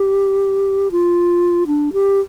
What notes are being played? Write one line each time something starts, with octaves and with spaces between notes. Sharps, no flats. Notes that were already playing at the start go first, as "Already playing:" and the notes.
Already playing: G4
F4
D4
G4